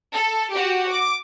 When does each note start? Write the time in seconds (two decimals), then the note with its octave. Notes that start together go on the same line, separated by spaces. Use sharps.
0.13 A4
0.52 F#4 G4
0.90 D6